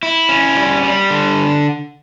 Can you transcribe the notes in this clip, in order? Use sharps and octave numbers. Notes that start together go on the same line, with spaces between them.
E4
C#4
G3
G3
D3